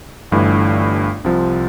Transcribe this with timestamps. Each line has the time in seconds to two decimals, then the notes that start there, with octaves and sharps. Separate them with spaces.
0.31 G1 G2 E3 A3 E4
1.24 C2 C3 F3